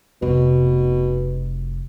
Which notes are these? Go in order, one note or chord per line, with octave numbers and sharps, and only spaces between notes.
F1 B2